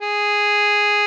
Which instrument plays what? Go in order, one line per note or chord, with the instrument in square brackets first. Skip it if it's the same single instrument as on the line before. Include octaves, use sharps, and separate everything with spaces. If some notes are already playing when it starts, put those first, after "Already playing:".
[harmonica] G#4